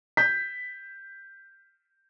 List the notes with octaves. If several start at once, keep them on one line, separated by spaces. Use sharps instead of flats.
G6 B6